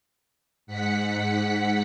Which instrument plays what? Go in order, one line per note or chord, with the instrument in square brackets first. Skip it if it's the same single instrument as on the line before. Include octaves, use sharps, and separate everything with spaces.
[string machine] G#2 F#5 B6 C#7